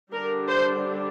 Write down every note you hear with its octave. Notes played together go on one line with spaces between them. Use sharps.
D3 G3 D4 A#4
C5